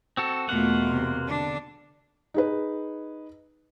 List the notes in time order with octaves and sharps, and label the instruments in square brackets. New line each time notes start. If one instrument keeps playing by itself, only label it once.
[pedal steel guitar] C4 F#4 A4
[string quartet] E2 B2 C6 [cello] A3 F4 [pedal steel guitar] A#3 F#5
[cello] C3
D3 D4
[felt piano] D#4 G#4 B4